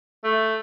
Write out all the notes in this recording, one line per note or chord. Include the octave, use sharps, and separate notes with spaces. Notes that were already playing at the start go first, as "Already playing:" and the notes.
A3